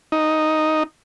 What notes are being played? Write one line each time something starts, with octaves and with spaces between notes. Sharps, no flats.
D#4